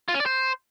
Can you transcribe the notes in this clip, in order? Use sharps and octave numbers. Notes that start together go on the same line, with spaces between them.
F4
C#4
D5
C5